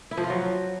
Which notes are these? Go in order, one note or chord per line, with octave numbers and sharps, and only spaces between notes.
E4
F3
F4
F#3